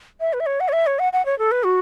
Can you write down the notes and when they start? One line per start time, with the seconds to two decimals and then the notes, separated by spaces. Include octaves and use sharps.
0.20 E5
0.33 B4
0.40 E5
0.46 C#5
0.60 F#5
0.68 C#5
0.73 E5
0.87 C#5
0.99 F#5
1.13 F#5
1.26 C#5
1.39 A4
1.51 B4
1.65 F#4